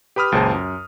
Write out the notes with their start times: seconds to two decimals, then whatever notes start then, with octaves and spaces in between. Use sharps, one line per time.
0.16 G4 B4 B5 D#6 F6
0.32 C#2 F#2 A#2 G#4 C5 A5
0.54 F#2